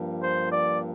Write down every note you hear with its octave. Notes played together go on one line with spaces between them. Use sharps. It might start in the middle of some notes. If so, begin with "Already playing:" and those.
Already playing: G2 F3 A#3
C5
D5